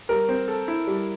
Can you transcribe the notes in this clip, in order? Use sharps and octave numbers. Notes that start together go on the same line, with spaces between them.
G3 A#4
C4
A4
E4
G3